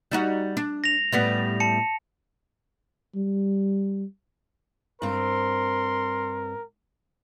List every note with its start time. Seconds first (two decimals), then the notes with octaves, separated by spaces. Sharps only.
0.11 G3 D#4 F#4
0.57 D4
0.84 A#6 F7
1.12 A2 G3 B3
1.60 A5 C#7
3.15 G3
5.02 G2 C4 A#4 C6